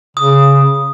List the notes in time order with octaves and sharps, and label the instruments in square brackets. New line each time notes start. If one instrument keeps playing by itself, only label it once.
[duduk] C#3 [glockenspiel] D#6